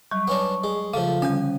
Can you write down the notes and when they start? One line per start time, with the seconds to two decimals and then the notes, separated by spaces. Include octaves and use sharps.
0.11 F#3 G3 C#6
0.28 B3 C#4 D4
0.64 G#3
0.94 C#3 F3 A3 F5
1.22 D3 G3 C#4 G#5